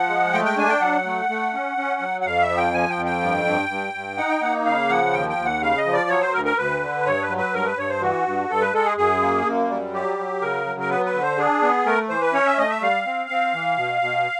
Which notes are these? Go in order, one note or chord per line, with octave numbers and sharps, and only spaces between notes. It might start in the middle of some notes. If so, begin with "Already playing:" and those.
Already playing: F3 F#5
G#3
A3 G5
G5
D4 G#5
G5
F#3 F#5
A3
A3
C#4
C#4
F#3
F#5
F2 F5
E5
F3
G5
F3 G#5
G5
F2
G5
G2
G2
G2
G2
D#4 F#5
G5
A#3 F#5
C#3 F5
F3 F#5
D#2 G5
G5
D#2
F#5
C#3 F5
D#5
F3
D5
F#3 C#5
C5
D2 A#4
A#4
D2 B4
D3
G2 C#5
B4
F#3
B4
G2 A#4
B4
G2 C#5
C5
E3 F#4
G2
G2 A4
B4
G#3 A4
G#4
F#2 G#4
A#3
F#2
G3
F#3 G4
F#3
C#3 A#4
F#3
A#4
B3 B4
B4
D3
C5
D4 G#4
B3
A3 A#4
E3 C5
B4
C#4 C#5
E5
A3 D#5
E5
G3 F5
C4
C4
E3
B2
B2